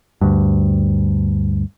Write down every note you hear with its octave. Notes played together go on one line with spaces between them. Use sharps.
D2 G2